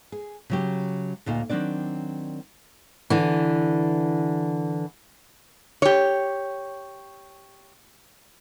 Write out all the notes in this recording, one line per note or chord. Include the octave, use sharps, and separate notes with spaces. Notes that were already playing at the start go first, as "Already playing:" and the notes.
G#4
C#3 F#3 G4
D2 A#2 D#4 F5
D#3 F#3 C4 D4 D5
D3 E3
G4 C#5